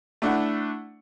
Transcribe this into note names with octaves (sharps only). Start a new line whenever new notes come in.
A3 D4 E4 F#5